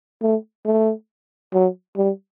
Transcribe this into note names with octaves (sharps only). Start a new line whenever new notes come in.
A3
A3
F#3
G3